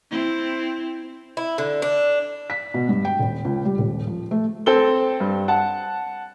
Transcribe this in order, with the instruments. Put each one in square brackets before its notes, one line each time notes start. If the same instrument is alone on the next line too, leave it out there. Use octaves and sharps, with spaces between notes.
[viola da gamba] C4 E4
[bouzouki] E4
D3
D4
[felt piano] B6
B2
G2
G5
D#1
C#2
G3
D#1
F3
A3
[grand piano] C4 A4 G7
G2
F#5 A5